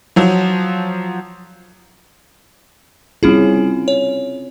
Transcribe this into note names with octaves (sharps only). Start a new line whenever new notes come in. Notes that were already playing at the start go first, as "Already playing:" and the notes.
F3 F#3
G3 C4 C#4 E4 F4 G#4
C#5